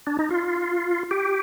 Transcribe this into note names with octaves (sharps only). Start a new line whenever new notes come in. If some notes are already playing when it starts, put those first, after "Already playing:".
D4
D#4
F4
G4